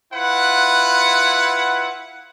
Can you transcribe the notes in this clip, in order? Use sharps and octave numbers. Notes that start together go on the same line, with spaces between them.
E4 F4 B4 F#5